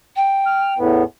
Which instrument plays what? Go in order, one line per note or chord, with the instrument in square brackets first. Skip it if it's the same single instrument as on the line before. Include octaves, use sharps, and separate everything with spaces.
[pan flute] G5
[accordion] F6
E2 A2 B3